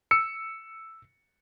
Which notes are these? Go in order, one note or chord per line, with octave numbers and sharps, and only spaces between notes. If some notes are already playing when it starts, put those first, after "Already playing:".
E6 C#7